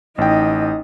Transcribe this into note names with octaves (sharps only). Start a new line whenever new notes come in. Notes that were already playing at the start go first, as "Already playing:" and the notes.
A1 D#4 D#5 G5